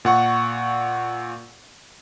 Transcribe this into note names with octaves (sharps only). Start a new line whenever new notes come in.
A#2 F#5 C#6